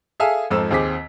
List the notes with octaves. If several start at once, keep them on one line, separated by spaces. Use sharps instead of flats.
G#4 A4 E5 F5 G#5 A5
F2 G#2 F3 C4 A4 E6
D#2 C4 G#4 D6 B6